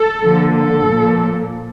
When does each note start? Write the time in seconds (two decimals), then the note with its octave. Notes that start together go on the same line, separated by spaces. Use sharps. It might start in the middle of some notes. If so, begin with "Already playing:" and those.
Already playing: A4
0.22 D3 F3 A#3
0.53 A4
0.86 A#2 F3 A#3